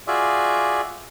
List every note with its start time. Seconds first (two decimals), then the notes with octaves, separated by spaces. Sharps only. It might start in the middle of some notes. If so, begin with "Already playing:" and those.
0.07 F4 F#4 G#4 D5 E5